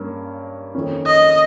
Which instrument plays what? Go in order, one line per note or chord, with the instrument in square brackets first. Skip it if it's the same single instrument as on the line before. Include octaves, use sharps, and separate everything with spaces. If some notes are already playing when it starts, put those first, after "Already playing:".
Already playing: [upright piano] G2 A#3 C#4
F2 D#3 A#3 C#4
[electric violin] D#5